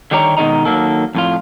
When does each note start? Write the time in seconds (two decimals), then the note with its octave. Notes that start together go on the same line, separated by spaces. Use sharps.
0.11 D3 D#3 G3 G4 C#5 A#5
0.37 B2 D#3 G#3 D#4 A#5
0.65 D#3 E3 F#3 A#3 A4
1.15 F2 A2 F4